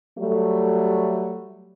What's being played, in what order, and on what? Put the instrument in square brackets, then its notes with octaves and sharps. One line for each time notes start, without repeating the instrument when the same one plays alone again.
[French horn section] F#3 G3 A3